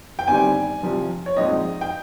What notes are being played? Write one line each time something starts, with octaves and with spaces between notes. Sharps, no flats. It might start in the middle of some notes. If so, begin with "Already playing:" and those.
G5
G1 G2 D#3 G3 C4 G#5
C2 C3 F3
C#5
A#1 G#2 F3 C4 D#4 D#5
G5